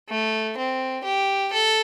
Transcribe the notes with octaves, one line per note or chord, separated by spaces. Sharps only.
A3
C4
G4
A4